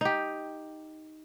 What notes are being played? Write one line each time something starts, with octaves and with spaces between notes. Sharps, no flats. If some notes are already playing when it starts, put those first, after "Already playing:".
D#4 G4